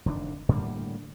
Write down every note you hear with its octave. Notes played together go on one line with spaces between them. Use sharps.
F1 D3 D#3 D4
A2 D3 G3 A#3